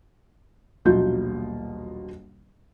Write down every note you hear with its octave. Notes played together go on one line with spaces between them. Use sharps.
D#1 A#1 B2 F#3 F4 G6